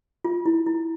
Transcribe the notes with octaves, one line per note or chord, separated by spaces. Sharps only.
F4
E4
E4